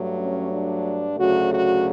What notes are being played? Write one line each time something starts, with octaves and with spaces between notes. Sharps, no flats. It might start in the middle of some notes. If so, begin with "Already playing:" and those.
Already playing: G2 F#3 A3
C#4
D4
D2 C#3 F#3 A3 F#4
F#4